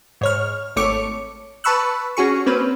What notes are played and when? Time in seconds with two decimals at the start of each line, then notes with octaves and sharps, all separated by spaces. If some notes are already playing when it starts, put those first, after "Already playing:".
0.21 G#2 C#5 F6
0.76 G#1 A3 C#5 D6 C#7
1.64 B4 A5 B5 C#6 E6 F#6
2.17 C#4 F#4 G#4 C#6
2.46 A#3 C4 C#4 B4